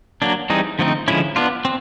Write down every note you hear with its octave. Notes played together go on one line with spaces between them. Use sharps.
F#3 A#3 D4
E3 G3 C4 D#4 G#4
D3 F3 A3 C4 D#4
D3 F3 G#3 C#4 E4
B3 D4 F4
C4